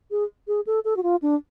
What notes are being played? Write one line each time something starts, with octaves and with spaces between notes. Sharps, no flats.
G#4
G#4
A4
A4
F#4
F4
D4